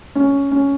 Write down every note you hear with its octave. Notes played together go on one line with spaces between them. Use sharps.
C#4
C#4